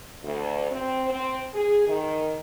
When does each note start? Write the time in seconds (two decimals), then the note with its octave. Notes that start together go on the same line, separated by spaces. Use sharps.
0.24 D2
0.71 C4
1.10 C4
1.54 G#4
1.88 D#3